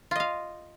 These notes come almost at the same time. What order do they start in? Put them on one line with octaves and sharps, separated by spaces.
F4 D#5 F5